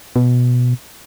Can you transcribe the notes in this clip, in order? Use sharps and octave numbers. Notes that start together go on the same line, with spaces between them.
B2